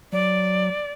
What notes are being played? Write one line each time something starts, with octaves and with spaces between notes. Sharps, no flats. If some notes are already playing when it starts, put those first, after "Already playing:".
F#3 D5